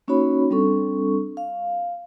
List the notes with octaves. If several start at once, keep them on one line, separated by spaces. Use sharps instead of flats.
A#3 C#4 D#4 F#4 C#5 B5
G3 C4 D4 A4 C#6
F5